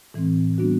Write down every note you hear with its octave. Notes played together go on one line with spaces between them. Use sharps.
A2 E3 G#3 C4
G3 B3 D4 F#4